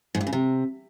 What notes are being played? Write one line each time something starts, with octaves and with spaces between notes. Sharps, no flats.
G#2
G2
C#3
C3